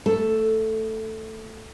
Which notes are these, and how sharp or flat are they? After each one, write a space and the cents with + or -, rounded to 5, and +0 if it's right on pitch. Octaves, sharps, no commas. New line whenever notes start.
A3 +15 A4 +0